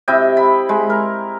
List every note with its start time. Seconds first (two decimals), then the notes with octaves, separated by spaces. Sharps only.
0.08 C3 E4 D#5 G5
0.37 B5
0.69 G#3
0.90 A#4